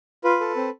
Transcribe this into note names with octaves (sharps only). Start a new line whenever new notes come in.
F4 B4
A4
C4